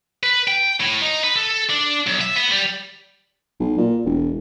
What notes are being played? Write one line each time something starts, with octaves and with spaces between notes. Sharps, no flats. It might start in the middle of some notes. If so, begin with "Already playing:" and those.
B4
G5
A2
D#4
B4
A4
D4
B1
E5
B3
G3
B1
A#2
E1